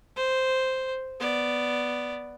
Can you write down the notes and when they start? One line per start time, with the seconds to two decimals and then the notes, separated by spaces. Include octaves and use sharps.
0.16 C5
1.20 B3 D5